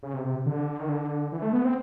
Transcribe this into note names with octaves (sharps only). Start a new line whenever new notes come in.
C#3
C3
C3
D3
D#3
D3
E3
A3
B3
C4